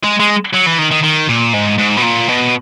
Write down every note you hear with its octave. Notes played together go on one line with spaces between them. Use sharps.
G#3
G#3
F#3
E3
D#3
D#3
D#3
A#2
G#2
G#2
B2
A#2
B2